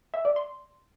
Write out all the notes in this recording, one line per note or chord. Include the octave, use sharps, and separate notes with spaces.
E5
D5
C6